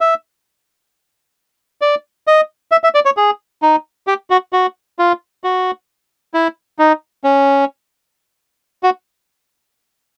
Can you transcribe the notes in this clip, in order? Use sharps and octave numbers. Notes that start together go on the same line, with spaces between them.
E5
D5
D#5
E5
E5
D5
C#5
G#4
D#4
G4
F#4
F#4
F4
F#4
E4
D#4
C#4
F#4